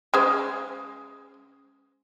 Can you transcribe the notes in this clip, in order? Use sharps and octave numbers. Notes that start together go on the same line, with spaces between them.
C#3 G#3 C5